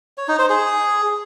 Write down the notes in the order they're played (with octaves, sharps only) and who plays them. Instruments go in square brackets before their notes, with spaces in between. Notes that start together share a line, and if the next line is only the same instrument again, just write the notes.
[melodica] C#5
D#4
C5
G#4